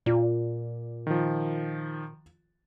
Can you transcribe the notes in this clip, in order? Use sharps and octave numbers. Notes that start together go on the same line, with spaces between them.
A#2 F4 D5
D#3 F3